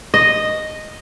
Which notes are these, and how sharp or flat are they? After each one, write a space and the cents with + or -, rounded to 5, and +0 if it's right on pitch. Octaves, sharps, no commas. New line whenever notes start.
D#5 -5